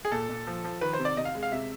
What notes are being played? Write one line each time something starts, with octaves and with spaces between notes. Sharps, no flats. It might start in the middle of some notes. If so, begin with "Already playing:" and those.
G#4
A#2 A4
A#2
F3
F3
D#3 B4
C5
C3
D5
C3 D#5
F5
G#3
F5
C3 E5